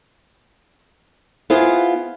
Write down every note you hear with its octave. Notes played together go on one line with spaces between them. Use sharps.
B3 E4 F4 G#4 B4 C5